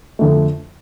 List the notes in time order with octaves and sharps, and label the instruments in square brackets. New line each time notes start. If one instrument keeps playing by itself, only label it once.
[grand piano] F2 D3 A3